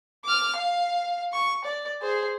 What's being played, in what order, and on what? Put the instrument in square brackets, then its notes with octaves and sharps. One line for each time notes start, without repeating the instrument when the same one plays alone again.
[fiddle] D6 F6
F5
C#6
D5
G#4 C5